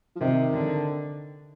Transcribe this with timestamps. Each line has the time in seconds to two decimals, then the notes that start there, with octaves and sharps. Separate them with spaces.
0.16 F3
0.21 C3 D#3
0.53 D3